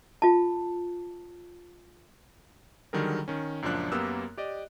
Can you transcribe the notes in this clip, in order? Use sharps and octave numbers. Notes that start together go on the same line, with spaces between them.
F4 A5
D3 D#3 F#3 G3 G#4 A#4
D#3 C#4
C#2 F#2 A#2 F3 D4 F#6
F#2 A#3 B3 G4 E6 F#6
G4 D5 D#5